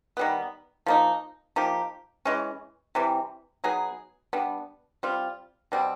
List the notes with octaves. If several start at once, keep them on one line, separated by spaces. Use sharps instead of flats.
D#3 G3 B3
F3 A#3 D#4
F3 A#3 D#4 G4
E3 G#3 C#4
C3 E3 G3
F#3 B3 D#4 G#4
G3 B3 D4
G3 C4 F4
B2 G3 C4